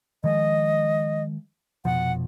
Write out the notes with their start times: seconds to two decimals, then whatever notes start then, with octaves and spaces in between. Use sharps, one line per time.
0.24 D#3 F3 G#3 D#5
1.85 F1 B2 F3 F#5